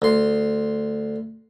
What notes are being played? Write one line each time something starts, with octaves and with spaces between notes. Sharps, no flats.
D2 C6